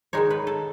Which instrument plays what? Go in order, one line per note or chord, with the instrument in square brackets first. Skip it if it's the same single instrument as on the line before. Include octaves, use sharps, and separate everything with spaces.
[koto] D#3 G#3 D#4 C#5
B4
A4